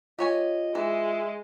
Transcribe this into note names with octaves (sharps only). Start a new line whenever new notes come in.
F4 G4 C#5 D#5 G#5
E3 G#3 E5